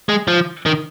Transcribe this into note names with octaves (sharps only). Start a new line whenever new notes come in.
G#3
F3
D#3